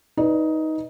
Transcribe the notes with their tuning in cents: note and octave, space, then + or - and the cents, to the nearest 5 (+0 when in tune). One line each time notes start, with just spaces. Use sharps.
D#4 +15 B4 -10 D5 +0